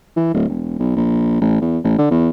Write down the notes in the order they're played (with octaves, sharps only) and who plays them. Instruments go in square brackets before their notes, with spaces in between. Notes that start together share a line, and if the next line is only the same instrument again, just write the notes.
[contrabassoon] E3
D1
E1
B1
A#1
A1
E2
A1
D3
E2